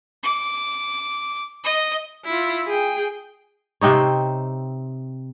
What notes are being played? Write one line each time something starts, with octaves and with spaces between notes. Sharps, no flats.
D6
D#5
E4 F4
G#4 G5
C3 C4 D#4 C#5